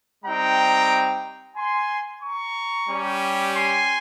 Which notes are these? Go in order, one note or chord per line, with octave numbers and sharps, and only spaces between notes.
G3 C4 D#4 G5 A#5
G#5 C6
A#5 C#6
G3 C#4 G4
G#5 C6